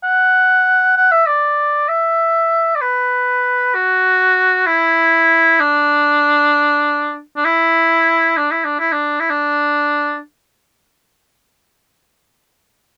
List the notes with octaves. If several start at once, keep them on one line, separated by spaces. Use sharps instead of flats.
F#5
F#5
E5
D5
E5
D5
B4
F#4
E4
D4
D4
E4
D4
E4
D4
E4
D4
E4
D4